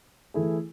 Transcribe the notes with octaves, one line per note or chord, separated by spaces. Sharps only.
E3 A3 E4 G#4